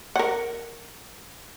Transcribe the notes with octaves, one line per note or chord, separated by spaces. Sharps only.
A#4 F#5